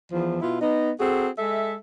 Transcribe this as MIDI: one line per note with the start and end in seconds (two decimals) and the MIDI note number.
0.12 0.39 40
0.12 0.39 53
0.42 0.58 47
0.42 0.58 59
0.42 0.58 64
0.42 0.58 65
0.61 0.91 59
0.61 0.91 63
1.00 1.28 60
1.00 1.28 66
1.00 1.28 68
1.00 1.28 69
1.39 1.74 56
1.39 1.74 69
1.39 1.74 76